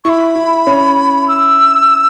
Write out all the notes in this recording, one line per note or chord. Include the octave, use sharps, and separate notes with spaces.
E4 C#6
B5
E4
C#4
E6